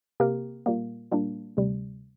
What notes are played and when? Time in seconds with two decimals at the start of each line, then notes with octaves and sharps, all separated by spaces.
0.20 C3 A#3 G4 A#4
0.66 A#2 G3 A#3
1.12 A#2 G3 A#3 D4
1.57 D2 C3 G3